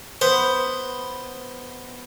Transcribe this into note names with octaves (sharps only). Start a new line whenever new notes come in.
B3 C5